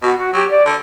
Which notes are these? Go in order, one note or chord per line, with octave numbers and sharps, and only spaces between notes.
B2 F#4
F#4
F#3 G4
D5
D3